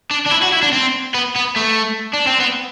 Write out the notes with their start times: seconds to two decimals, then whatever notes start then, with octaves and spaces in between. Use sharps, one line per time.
0.11 D4
0.26 D4
0.31 E4
0.42 F#4
0.52 E4
0.63 D4
0.73 C4
1.15 B3
1.36 B3
1.56 A3
2.13 D4
2.27 C4
2.40 B3